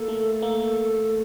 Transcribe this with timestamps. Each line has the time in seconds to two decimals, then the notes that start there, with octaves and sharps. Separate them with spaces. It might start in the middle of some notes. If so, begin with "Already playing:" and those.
Already playing: A#3 A4
0.08 A3
0.42 A#3